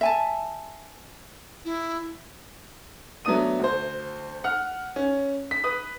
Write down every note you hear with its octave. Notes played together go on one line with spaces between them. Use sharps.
E5 G#5 A5
E4
F#3 A3 B3 D4 D#6 D#7
D2 C5
F#5 F6
C#4
B6
B4 D#6